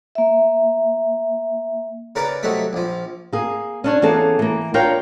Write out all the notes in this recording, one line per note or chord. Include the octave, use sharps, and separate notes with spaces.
A#3 E5
C#3 A#4 B4 D5 A#5 D6
C3 F#3 A3 D#4 E5
A#1 F3
A#3 G#4
C#4 D4 C#5
E3 A#3 B3 C#4 G#4 A4
E3 A#3
D4 F4 A#4 C#5 G5